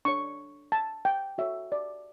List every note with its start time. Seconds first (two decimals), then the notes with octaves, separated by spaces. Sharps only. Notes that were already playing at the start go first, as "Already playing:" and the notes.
0.05 D4 A4 C#5 C#6
0.72 A5
1.05 G5
1.38 F#4 A4 C#5 E5
1.72 D5